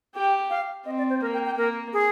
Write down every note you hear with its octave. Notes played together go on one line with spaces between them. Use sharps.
G4 G5
F5
C4 D#5
D5
C5
A#3 A#4
G5
G5
A#3 A#4
G#4